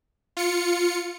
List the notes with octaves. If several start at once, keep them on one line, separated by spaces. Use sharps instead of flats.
F4 C#7